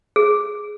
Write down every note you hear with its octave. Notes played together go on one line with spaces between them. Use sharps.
G#4